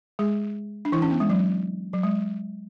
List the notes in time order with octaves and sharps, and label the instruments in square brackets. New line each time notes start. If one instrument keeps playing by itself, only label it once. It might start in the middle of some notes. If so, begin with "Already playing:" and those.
[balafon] G#3 G#4
D4
E3 E4
C#4
B3
G#3
F#3
F#3
G#3